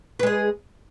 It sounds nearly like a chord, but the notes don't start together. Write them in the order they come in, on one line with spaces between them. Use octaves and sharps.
B4 G#3 G#4